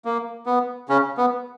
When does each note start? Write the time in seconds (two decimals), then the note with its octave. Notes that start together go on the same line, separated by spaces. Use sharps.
0.05 A#3
0.46 B3
0.89 C#3 C#4
1.17 B3